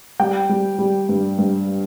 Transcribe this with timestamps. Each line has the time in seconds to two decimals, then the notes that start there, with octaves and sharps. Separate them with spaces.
0.19 G3 G5
0.49 G3
0.79 G3
1.09 G2
1.38 G2